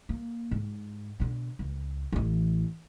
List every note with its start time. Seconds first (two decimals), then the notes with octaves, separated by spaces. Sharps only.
0.09 A#3
0.51 G#2
1.20 B2 D3
1.59 C#2
2.12 A1 E3